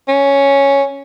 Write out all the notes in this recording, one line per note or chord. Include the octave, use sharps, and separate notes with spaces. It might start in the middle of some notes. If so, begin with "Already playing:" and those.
C#4